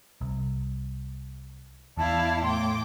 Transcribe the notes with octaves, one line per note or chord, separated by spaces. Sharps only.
C2
E2 E4 D5 F5 A5
A2 G5 C6 D6